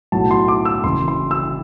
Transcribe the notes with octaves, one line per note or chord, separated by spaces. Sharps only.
B1 A2 F#3 A5
C6
D6
E6
F#1 F#2 E3 C6
C6
E6